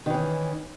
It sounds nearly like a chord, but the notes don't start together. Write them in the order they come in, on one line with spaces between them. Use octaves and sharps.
D#3 E3 C#4